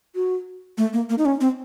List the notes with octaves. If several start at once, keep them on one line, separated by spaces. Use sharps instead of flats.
F#4
A3
A#3
A#3
D#4
C#4
C4